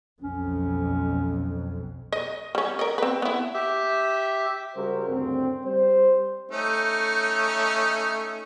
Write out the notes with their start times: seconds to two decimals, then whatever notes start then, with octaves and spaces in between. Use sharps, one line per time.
0.22 B1 F2 C#4
2.12 D#5
2.55 G3 C#4
2.79 A#4 D#5
2.98 C4 B4
3.22 B3 E4
3.54 G4 E5
4.76 C#3 G3 F#4 G#4 A#4 C5
5.09 D2 G2 C#3 C4
5.65 G3 C5
6.51 A3 C#4 D#4